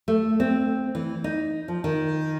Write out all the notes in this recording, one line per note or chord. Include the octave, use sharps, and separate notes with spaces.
A3
C4
E3
D#4
F3
D#3